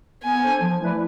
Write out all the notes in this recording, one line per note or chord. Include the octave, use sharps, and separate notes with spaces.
B3 G#5
D4 A4 C5
F3
A3 E4 B4 D5